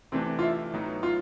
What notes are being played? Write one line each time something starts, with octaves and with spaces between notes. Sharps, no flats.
C3 E3 A3 C4 D4 G4
F4
E4
A2 F#3 B3 D#4
F4